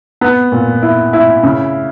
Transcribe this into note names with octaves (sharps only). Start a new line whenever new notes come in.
B3
A#2
E4
E4
C#3